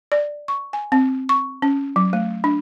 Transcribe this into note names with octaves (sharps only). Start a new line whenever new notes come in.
D5
C#6
G#5
C4
C#6
C#4
F#3
A3
D4